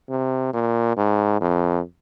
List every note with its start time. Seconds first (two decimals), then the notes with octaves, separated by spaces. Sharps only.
0.09 C3
0.53 A#2
0.97 G#2
1.41 F2